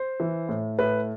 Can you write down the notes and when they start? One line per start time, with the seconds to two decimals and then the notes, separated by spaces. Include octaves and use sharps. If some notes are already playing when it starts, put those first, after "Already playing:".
Already playing: C5
0.20 E3
0.49 A2
0.79 A2 B4